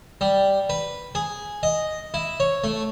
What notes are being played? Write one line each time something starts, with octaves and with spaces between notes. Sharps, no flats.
G3
B4
G#4
D#5
E4
C#5
A3